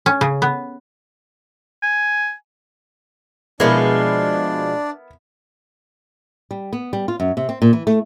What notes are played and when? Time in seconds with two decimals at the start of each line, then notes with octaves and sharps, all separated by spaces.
0.06 C#4
0.21 C#3
0.42 B3
1.82 G#5
3.60 B2 F3 G#3 B3 D4 E4 A#4 D5
6.51 G3
6.73 B3
6.93 G3
7.08 F4
7.20 F#2
7.37 C3
7.49 C4
7.62 A#2
7.73 E3
7.87 A3